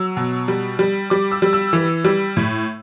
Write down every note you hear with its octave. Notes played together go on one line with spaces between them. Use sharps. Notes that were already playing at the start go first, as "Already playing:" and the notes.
Already playing: F#3 E6
B2
G3
G3
G3 D6
E6
G3
E6
E3
G3
A2